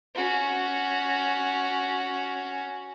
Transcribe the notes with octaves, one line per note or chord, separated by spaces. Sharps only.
C#4 F#4